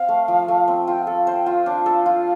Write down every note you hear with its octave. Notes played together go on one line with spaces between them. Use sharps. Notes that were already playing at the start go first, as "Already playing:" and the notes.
Already playing: C4 F5
A3
F3
A3
C4
F4 G5
A4 F5
F5
C5 G5
F4 F5
D4
A4
F4